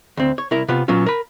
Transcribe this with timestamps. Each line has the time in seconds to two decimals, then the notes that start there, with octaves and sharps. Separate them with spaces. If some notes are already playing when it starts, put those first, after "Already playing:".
0.17 D2 C4
0.38 C#5
0.51 C2 E4 A#4
0.68 C3 B3 F4
0.88 A#2 F#3 B3 C#4 F4
1.06 A#4 B5